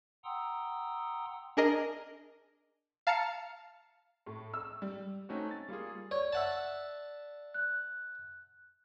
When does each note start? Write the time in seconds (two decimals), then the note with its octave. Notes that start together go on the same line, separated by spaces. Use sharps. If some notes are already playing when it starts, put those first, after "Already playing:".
0.25 F#5 G5 A#5 C6 D#6 E6
1.57 D4 G#4 A#4 D#5
3.07 F5 A5 A#5 F6 C#7
4.26 A2
4.54 E6
4.82 G3
5.29 A3 C4 C#4 D#4 F#4
5.51 A6
5.69 G3 A#3 F4 G#4
6.11 C#5 D5
6.33 E5 F#5 A5
7.54 F#6